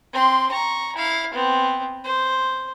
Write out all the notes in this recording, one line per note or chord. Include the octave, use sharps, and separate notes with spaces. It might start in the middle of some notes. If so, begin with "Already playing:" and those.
C4 C6
A#5 C#6
E4 F5
B3 C4
C5